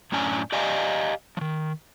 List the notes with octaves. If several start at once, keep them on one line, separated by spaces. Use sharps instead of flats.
F#2 A2 C#4 D4 G#5
G4 D5 D#5 F5 G#5
D#3 F3